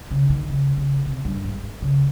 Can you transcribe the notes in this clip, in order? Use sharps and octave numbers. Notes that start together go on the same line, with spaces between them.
C#3
D#3
C#3
C#3
C3
G2
G#2
C#3